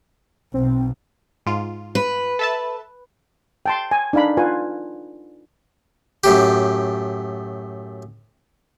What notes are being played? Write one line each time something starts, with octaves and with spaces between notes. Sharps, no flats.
B1 B2 C4
G#2 F4
B4
A4 E5 A5
G5 A5 C6
G#5
D4 D#4 F5 B5
F4 B4 G#5
F#2 A2 G4